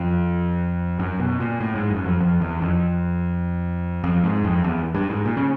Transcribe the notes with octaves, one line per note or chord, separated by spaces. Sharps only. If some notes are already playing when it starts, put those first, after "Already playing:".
Already playing: F2
F#2
B2
A#2
A2
G#2
F#2
F2
F2
E2
F2
F2
G#2
F2
E2
G2
G#2
A#2
C#3